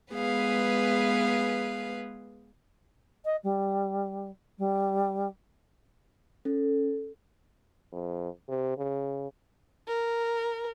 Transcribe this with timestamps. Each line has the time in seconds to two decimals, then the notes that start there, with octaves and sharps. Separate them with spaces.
0.13 G#3 B3 G#4 B4 F5
3.25 D#5
3.43 G3
4.58 G3
6.45 C#4 A4
7.93 F2
8.48 C3
8.78 C#3
9.88 A#4